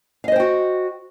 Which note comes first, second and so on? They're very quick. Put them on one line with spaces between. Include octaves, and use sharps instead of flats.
F5 D#5 C5 G5 F#4